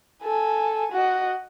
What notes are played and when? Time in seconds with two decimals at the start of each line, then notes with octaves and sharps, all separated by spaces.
0.24 A4 G#5
0.92 F#4 D#5